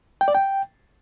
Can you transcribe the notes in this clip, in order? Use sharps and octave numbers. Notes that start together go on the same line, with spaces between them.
G5
D5
G5